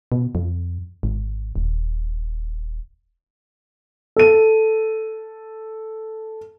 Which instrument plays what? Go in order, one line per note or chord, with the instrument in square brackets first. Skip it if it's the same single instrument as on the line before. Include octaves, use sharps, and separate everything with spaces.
[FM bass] B2
F2
G#1
D#1
[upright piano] A4 D#7